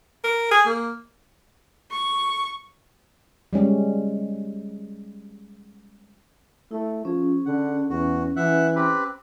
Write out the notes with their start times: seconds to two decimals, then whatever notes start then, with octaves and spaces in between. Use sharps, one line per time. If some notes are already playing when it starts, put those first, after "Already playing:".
0.24 A#4
0.51 G#4
0.66 A#3
1.91 C#6
3.53 G3 G#3 C#4
6.71 A3 E4
7.05 F3 C#4 G#4
7.46 D3 F#5
7.90 E2 F#4
8.36 E3 E5 F#5 F#6
8.76 C4 G4 B4